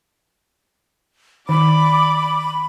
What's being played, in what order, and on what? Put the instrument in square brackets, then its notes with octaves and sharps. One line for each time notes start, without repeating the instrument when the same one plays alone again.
[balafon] D#3 [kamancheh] D5 D6 [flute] B5